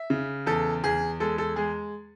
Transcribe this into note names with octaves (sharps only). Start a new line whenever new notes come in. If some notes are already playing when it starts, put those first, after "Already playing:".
Already playing: E5
C#3
E2 A4
E2 G#4
G#3 A4
A4
G#3 G#4